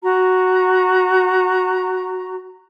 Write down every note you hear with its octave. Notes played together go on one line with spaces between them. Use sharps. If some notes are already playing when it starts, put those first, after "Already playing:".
F#4 A#5